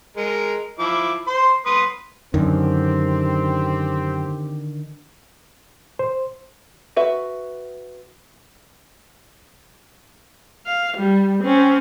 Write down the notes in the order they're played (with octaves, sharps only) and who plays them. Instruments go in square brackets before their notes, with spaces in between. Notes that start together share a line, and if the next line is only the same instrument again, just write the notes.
[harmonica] G#3 A#4
F3 E4 D6
C5 C6
B4 C6 D#6
[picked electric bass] F#2 [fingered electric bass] D3 D#3 [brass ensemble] C4 G4
[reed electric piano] C5
[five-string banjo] F#4 B4 E5
[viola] F5
G3
C4 C#4